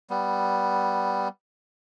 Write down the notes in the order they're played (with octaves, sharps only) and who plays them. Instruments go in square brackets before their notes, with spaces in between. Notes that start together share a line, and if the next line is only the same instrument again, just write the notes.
[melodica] G3 B3